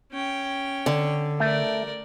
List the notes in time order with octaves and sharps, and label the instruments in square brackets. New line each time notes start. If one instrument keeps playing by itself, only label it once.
[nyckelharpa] C#4 G5
[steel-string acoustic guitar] D3
[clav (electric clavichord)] A3 [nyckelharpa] A#4 D5